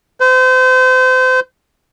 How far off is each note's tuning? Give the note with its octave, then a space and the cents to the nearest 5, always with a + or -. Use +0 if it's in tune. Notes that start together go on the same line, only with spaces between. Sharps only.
C5 -35